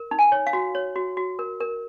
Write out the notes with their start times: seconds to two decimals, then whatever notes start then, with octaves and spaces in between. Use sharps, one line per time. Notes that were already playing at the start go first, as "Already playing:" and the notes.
Already playing: A#4
0.11 D#4
0.19 G#5
0.32 C#5
0.47 F5
0.53 F#4
0.75 C#5
0.96 F#4
1.17 F#4
1.39 A#4
1.60 A#4